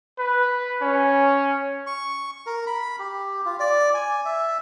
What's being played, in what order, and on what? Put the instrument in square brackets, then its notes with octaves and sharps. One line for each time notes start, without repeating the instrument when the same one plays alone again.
[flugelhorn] B4
C#4
[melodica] C#6
A#4
B5
G4
F4
D5
G#5
E5